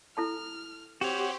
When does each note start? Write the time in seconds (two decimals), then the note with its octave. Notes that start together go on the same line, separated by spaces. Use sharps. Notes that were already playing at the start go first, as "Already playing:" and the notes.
0.17 E4 A4 A5 F6
1.01 C4 F#4 G4 C5 C#5